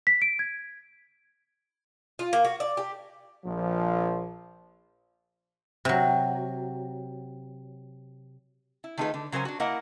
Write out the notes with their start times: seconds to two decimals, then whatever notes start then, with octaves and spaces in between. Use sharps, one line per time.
0.07 B6
0.22 D7
0.39 G#6
2.19 F4
2.33 A#3
2.45 F#4
2.60 D5
2.77 G4
3.46 A#1 F3
5.85 C3 F#3
8.84 E4
8.98 D#3 A3 D#4 F4 G#4 B4
9.14 D3
9.32 C#3 F#3 A#4 C5 G#5
9.45 D4 F#4
9.60 A#3 E4 A#4 D#5 F#5